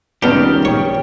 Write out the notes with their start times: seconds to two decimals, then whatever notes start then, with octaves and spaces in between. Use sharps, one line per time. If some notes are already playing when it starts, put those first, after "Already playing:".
0.23 C#2 D#3 G3 B3 D4 G4 F6
0.65 A#1 C#5 G5